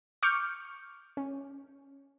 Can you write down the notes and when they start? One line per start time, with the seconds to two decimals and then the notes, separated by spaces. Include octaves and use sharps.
0.23 C#6 D6 F6 G6 C#7
1.17 C#4